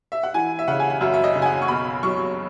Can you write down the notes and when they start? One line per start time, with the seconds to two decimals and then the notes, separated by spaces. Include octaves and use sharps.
0.12 E5
0.23 F#5
0.34 E3 G#5
0.59 E5
0.68 C#3 F#5
0.79 G#5
0.90 F#5
1.01 F#2 E5
1.14 E5
1.24 D#5
1.35 C#3
1.42 G#5
1.46 F#5
1.62 C#6
1.68 B1 B5
2.03 F#3 C#6